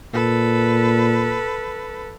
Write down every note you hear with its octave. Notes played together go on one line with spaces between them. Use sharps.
A#2 A4 B4